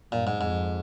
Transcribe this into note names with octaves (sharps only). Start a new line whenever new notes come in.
G2 A#2
G#2
F2 G#2